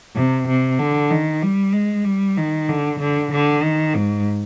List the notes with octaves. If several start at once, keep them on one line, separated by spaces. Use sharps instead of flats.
C3
C3
D3
D#3
G3
G#3
G3
D#3
D3
D3
D3
D#3
G#2